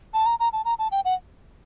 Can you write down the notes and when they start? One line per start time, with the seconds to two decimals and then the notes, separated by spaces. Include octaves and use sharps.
0.14 A5
0.26 A#5
0.40 A#5
0.53 A5
0.65 A#5
0.79 A5
0.92 G5
1.05 F#5